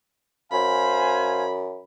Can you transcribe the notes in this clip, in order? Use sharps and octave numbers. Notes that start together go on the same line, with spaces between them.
F#2 C5 F5 G#5 B5